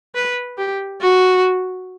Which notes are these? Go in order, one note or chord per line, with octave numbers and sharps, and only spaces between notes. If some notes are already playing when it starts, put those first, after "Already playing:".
B4
G4
F#4